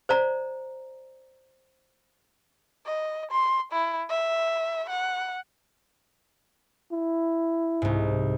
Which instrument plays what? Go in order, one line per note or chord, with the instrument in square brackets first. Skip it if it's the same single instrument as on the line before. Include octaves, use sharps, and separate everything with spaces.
[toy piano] C5 D5 A#5
[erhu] D#5
C6
E4
E5
F#5
[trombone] E4
[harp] C2 G#2